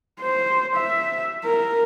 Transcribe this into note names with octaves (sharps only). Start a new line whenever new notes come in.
C5
E5
A#4